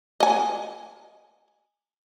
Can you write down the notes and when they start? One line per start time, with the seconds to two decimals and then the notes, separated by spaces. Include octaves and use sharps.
0.20 D#5 G#5